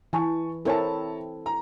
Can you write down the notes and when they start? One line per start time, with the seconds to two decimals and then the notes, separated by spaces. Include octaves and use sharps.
0.13 E3 G#5 A5 C#6
0.65 C4 E4 A4 A#4 C#5 A5
1.46 A#5